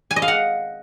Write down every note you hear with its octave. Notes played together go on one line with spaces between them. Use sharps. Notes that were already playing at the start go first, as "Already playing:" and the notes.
G#5
D#5
F5
F#5